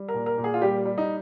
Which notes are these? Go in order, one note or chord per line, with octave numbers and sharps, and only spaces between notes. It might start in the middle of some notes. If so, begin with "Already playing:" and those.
Already playing: G3
A#4
A#2
A#4
A#2
G#4
F4
G3 G4
G3
D#4